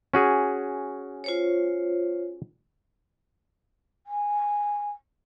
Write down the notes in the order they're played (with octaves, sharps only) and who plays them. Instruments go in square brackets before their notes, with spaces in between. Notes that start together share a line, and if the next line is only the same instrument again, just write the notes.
[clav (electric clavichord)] C#4 F#4 G#4
[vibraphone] F4 C5 C#5
[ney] G#5